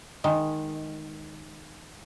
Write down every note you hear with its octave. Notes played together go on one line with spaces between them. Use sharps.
D#3 G#3